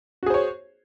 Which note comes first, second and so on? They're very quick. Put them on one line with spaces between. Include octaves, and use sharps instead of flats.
F#4 G#4 C5 C#5